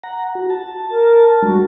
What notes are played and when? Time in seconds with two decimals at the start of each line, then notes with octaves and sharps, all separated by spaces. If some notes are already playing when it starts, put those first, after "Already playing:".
0.04 F#5 A#5
0.35 F#4
0.50 A5
0.91 A#4
1.43 G3 G#3 D4 F#4